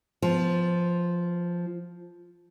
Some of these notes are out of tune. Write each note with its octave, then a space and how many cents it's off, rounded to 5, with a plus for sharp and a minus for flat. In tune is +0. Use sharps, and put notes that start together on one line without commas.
F3 +0 B3 +30